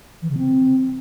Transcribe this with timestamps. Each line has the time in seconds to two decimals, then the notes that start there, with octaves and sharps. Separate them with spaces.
0.22 E3
0.30 C#3
0.38 C4